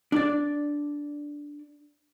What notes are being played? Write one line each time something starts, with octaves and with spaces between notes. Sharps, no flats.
D4 D5